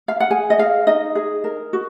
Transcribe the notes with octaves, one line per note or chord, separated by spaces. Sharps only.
F5
F#5
G#4 G#5
D#5
G#4 F5
D#4 D#5
G#4
A#4
F#4